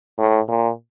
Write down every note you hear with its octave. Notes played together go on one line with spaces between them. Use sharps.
A2
A#2